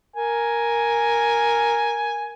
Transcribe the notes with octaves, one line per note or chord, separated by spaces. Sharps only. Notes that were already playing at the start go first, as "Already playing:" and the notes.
A#4 G#5